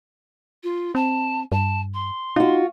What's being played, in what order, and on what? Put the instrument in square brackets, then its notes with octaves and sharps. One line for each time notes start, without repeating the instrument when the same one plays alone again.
[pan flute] F4
[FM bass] C4 [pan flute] A5
[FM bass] G2 [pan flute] A5
[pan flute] C6
[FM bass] D#4 [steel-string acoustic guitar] F4 F#4